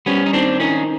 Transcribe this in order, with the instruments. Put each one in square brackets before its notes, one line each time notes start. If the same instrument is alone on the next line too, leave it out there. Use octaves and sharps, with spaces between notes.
[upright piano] G3 [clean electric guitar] B3 C#4
[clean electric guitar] D#4
[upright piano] D#3 [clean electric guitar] C4 D4
[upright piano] D#3 [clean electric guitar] C#4 D#4